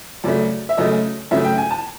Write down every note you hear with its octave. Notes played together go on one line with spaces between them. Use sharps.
F#2 C#3 F#3 A3 D5
E5
F#2 C#3 F#3 A3 D#5
F#2 C#3 F#3 A3 E5
G5
G#5
A5